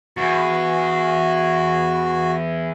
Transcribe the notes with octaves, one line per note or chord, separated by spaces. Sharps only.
E2 F#4